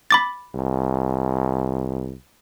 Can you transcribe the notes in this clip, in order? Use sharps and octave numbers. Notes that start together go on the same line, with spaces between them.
B5 D6 A6
C2